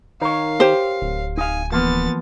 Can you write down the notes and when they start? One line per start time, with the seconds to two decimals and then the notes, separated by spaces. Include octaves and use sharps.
0.21 D#3 A#4 C#5 F5
0.60 G4 C5
1.02 D1
1.37 D#4 F5 G#5
1.72 E3 F3 A#3 B3 A6